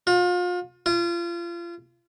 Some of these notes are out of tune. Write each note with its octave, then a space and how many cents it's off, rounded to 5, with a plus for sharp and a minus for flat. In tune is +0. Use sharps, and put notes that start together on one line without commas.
F4 +35
F4 -30